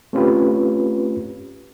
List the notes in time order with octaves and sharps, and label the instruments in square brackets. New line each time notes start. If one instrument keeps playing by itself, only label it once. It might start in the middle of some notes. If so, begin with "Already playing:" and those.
[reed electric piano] A3 C4 C#4 F4 G4 B4